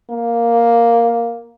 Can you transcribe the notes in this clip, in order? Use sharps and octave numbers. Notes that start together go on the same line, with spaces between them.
A#3